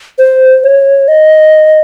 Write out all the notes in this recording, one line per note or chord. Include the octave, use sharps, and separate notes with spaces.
C5
C#5
D#5